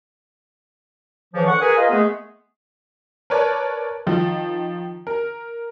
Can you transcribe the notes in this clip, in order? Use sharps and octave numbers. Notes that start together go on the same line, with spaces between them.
C#3 E3 F3
D3 F#5 C#6
G#4 A#4 B4 G#5
F4 A#4 B4 D#5
G#3 A3 B3 G#4
A#4 B4 C#5 D5 A5
D#3 F3
A#4